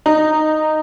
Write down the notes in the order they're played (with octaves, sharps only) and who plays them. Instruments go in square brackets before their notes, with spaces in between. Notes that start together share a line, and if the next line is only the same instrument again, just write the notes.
[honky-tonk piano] D#4